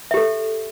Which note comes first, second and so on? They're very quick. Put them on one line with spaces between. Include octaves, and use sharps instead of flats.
E5 G4 A4